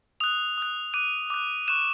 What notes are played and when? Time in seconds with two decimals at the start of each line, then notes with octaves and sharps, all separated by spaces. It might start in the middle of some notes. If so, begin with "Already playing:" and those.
0.20 D#6 F#6 F7
0.58 D#6 F#6
0.94 D6 F#6 D#7
1.30 D6 F#6
1.68 C#6 F#6 E7